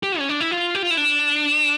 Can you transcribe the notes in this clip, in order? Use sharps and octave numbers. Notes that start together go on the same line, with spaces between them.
G4
C#4
D4
E4
F4
G4
F4
E4
D4